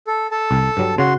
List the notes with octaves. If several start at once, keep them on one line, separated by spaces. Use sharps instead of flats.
A4
A4 A5
C2
G2 F#3 G3
C#3 F#4 C6